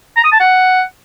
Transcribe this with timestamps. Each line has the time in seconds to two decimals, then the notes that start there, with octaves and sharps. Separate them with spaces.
0.17 A#5
0.24 D#6
0.32 A5
0.40 F#5